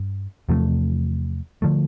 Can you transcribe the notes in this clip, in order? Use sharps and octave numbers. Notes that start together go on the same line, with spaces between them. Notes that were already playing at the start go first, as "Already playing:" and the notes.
Already playing: G2
E2 C3 F3 A3
D3 F3 A3